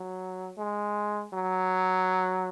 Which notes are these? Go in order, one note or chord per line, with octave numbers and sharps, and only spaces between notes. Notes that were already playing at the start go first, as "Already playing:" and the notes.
Already playing: F#3
G#3
F#3